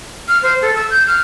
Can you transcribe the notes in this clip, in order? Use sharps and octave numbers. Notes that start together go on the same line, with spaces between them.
F6
C5
A4
E6
G6
F6